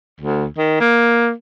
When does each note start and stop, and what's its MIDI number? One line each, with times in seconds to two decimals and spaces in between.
0.20 0.45 38
0.58 0.80 51
0.80 1.31 58